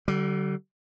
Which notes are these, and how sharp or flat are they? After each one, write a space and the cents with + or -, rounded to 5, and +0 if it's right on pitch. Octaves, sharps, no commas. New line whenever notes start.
D3 +0 G3 -40